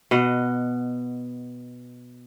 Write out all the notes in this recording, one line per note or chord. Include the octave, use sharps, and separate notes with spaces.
B2 D#5 F#5